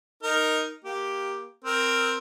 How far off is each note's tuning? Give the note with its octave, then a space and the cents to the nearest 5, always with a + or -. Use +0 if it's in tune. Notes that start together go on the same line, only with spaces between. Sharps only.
D#4 +0 A#4 +0
A#3 +10 G4 +0
C4 +5 A#4 +0